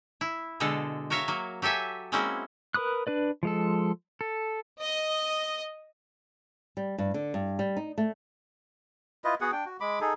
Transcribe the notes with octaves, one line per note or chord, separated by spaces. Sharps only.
E4
B2 D3 G#3 A4
F#4 A#4 C#5 E5 F5
F#3 A#3
F#3 G4 A4 E5 G#5
G#3 A#3 C4 C#4 E4 F#4
A#4 B4 B5 D#6 F#6
D4 B4 D5
F3 G#3 A4
A4
D#5
G3
G2
D3
G2
G3
D#4
A3
E4 F4 B4 D#5
B3 F#4 G#4 F#5
D4 G5
F#4
G#3 B5 D6
D#4 G#4 A4